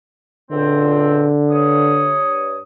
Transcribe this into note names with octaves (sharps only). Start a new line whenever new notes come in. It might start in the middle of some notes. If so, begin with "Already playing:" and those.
C#2 A#2 D3 C4
G2 C#5 D#6